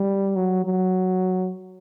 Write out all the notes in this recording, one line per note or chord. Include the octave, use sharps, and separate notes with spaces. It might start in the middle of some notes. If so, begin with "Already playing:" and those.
Already playing: G3
F#3
F#3